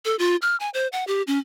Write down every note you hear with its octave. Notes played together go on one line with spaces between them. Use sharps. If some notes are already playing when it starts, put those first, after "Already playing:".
A4
F4
F6
G#5
C5
F#5
G4
C#4